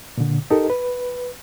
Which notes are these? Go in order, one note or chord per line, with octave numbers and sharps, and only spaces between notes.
A#2 D3
D#4 G4 A4 A#4 D#5
B4